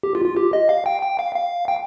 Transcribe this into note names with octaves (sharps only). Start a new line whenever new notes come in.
G4
F4
F4
G4
D#5
F5
G5
G5
F5
F5
G5